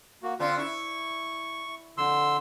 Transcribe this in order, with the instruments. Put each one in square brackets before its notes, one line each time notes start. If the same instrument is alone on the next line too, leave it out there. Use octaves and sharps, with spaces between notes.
[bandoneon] A#3 F#4
[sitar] D3 C4 D4 [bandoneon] F4
[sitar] E4 [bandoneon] C#6
[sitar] F2 [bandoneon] D3 C6 E6